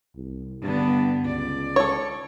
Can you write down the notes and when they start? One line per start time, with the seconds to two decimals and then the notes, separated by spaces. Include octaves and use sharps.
0.15 C2
0.62 G2 D3 B3
1.24 C#2 D5
1.76 A4 C#5